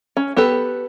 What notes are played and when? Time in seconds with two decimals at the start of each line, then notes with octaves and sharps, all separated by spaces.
0.17 C#4
0.37 B3 G4 A4 B4